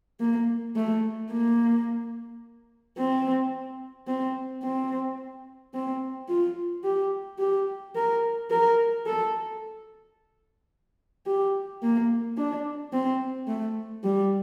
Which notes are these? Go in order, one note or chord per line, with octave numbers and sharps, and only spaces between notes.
A#3
A3
A#3
C4
C4
C4
C4
F4
G4
G4
A#4
A#4
A4
G4
A#3
D4
C4
A3
G3